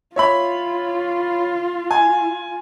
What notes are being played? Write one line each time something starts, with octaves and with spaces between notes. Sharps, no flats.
F4 C#5 E5 B5
G#5